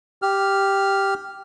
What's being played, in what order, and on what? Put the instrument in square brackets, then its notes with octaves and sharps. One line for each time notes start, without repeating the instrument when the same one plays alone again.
[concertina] G4 F6